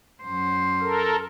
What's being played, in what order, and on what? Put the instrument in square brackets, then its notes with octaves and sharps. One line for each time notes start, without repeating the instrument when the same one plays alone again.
[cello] F#2 C5
[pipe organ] A4 A#4